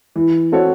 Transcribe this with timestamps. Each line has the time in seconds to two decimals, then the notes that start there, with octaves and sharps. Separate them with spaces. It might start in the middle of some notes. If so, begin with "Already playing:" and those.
0.16 E3
0.52 C4 F#4 A4 C#5